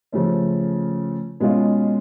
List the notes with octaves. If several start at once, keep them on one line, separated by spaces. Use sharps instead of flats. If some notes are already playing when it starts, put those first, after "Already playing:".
C#3 F3 A3 C#4
B2 G#3 C#4 F4